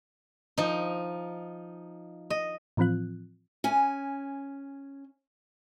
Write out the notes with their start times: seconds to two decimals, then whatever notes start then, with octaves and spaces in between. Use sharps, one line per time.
0.58 F3 D#4
2.30 D#5
2.77 A2 E3 F3 C4 F4 F#6
3.64 C#4 G#5